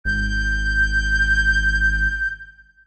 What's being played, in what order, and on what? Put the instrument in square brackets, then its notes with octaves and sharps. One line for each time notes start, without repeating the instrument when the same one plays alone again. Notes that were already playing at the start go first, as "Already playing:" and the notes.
[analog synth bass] G#1 [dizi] G6